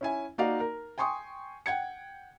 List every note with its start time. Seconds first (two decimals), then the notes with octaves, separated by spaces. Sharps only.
0.01 C#4 E4 G#5
0.38 A#3 D#4 F#4 D5 F5
0.60 A#4
0.98 G5 G#5 C6 C#6 D#6
1.66 F#5 G5 G#6 C#7